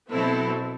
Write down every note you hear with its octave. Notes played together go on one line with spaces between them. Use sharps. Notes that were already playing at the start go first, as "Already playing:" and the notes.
B2 F#3 C4 E4 A4